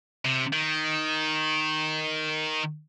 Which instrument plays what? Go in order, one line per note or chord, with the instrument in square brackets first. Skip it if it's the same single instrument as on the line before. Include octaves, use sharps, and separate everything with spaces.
[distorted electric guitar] C3
D#3